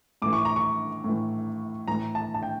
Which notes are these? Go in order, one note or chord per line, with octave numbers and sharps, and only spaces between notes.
A2 E3 D6
C#6
A#5
C#6
A2 E3
A2 E3 A#5
A5
A5
G5